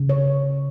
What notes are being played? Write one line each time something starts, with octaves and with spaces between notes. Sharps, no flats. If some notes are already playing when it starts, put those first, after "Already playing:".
Already playing: C#3
C#5